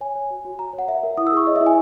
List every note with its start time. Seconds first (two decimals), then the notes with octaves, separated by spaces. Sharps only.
0.01 C#5 G#5
0.16 C#5
0.30 F#4
0.45 F#4
0.59 F#4 A#5
0.73 C#5
0.79 F#5
0.88 A#4 E5
1.03 A#4
1.18 E4 D#6
1.27 E6
1.32 G#4 C#6
1.47 C#5 D#5
1.56 E5
1.61 E4
1.66 G#5